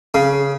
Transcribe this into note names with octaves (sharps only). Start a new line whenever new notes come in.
C#3